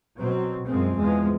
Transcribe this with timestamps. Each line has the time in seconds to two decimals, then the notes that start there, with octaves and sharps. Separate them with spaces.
0.18 B2 F#3 C4
0.66 F#2 F3 G#3 C4
0.96 E2 F3 G#3